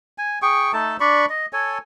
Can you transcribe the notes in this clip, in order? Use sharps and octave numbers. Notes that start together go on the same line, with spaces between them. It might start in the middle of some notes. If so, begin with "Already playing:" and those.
G#5
G#4 G5 C#6
A3 D#4 A4 A5
D4 D5 B5 C#6
D#5
A4 C#5 G#5